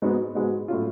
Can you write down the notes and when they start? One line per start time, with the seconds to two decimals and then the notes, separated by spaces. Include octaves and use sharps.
0.02 G#2 G#3 B3 F#4
0.35 G#2 G#3 B3 F#4
0.68 A2 F#3 C#4 F4